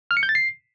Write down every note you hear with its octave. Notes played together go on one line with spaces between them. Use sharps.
F6
C#7
G6
A6
C7